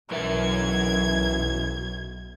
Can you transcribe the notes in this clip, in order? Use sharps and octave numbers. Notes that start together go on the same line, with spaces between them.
B1 F#2 E3 A#4 E5 G#6